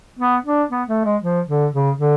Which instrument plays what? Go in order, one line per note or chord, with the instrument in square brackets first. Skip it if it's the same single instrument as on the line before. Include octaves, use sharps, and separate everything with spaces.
[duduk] B3
D4
B3
A3
G#3
F3
D3
C#3
D3